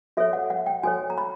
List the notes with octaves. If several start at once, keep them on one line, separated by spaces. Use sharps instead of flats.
F#4 A4 C#5 E5
F#5
F#5
G5
F#4 A4 C#5 G#5
A#5
B5